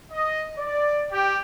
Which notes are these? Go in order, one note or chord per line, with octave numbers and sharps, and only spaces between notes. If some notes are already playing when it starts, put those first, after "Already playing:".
D#5
D5
G4